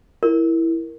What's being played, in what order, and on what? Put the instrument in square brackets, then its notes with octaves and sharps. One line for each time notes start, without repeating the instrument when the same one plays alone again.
[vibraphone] E4 [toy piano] A#4